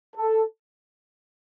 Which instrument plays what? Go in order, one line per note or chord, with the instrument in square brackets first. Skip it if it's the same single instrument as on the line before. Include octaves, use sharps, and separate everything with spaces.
[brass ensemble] A4